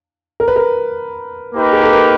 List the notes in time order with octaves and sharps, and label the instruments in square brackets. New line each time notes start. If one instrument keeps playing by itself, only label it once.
[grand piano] A#4
B4
A#4
[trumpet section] A#3 D#4 G4 B4
[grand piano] G#4
A4
A#4